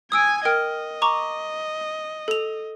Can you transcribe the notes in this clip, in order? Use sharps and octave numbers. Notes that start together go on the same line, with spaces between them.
G#5 D#6 E6 G#6 D7
A#4 D#5 G5 F6
A#5 C#6 D6
A4 F7